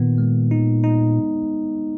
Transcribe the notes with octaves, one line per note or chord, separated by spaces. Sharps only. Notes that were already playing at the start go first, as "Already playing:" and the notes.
Already playing: A#2 D#3 B3
G#3
D#4
D#4